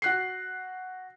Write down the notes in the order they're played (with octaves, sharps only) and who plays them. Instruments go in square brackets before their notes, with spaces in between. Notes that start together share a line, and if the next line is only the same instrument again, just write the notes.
[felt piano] F#4 F#6 C7